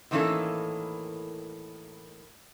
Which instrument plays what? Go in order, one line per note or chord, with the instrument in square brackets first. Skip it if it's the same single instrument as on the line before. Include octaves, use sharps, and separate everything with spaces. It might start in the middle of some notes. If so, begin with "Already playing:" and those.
[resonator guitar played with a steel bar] A2 D#3 E3 A#3 C#4 A4